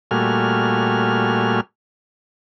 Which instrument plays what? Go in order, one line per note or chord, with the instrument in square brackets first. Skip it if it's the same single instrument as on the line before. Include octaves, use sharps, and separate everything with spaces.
[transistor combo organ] A#2 G3 A3 F#4 G#5 F6